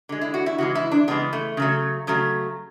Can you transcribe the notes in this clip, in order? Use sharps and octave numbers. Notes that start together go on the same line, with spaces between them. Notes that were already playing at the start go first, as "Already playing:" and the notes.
D3 G#3
E4
F#4
E4
C#3 E3 G#3 F#4
E4
D4
C#3 E3 G#3 B3
A3
C#3 F#3 A3
C#3 F#3 A3